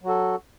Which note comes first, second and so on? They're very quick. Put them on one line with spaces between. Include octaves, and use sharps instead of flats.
F#3 F#4 A4